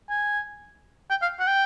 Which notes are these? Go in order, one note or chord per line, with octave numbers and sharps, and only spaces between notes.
G#5
G5
F5
F#5
G5